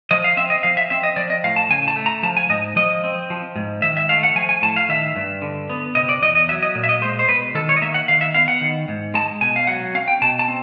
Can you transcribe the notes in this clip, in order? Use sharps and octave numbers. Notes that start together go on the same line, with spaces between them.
F3 D#5
F5
C4 E5
D#5
F3 F5
E5
C4 E5
D#5
F3 D5
D#5
A2 F5
A5
C#3 G#5
A5
A3
A#5
F3 A5
G#5
G#2 D#5
F3 D#5
C4
F3
G#2
D#3 E5
E5
A3 F5
F#5
F3 G#5
G#5
A2 A5
F5
D#3 E5
G2
D3
B3
C3 D#5
D5
E2 D#5
D#5
F#3 E5
D#5
A#2
E5
D#5
G#3 C5
C5
B2 B4
D#3 A4
C#5
D#5
A#3 E5
F#5
D#3 F5
E5
B3 F5
F#5
D#3
G#2
G#3 A5
B2 G#5
F5
F#3 F#5
C4 F5
G5
B2 A5
A5
C4